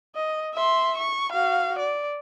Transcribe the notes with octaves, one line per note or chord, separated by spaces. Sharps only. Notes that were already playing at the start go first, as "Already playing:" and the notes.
D#5
E5 C6
C#6
F#4 F5
D5